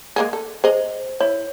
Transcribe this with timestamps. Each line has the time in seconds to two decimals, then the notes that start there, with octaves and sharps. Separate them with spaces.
0.16 G#3 A#3 G#4
0.33 A4
0.64 G#4 C5 D#5
1.20 E4 C#5